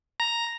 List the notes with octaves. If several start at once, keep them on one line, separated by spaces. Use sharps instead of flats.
A#5